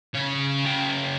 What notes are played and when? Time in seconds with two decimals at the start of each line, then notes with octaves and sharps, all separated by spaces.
0.14 C#3 C#5
0.66 C#3 G5